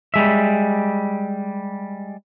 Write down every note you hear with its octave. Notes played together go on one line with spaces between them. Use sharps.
G3 G#3 E5